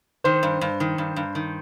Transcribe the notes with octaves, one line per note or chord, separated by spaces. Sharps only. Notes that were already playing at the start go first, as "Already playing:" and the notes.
D#3 C5
G2
G2
D#3
G2
G2
D#3